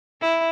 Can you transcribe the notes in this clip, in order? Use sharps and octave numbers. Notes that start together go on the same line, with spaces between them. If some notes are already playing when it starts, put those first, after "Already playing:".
E4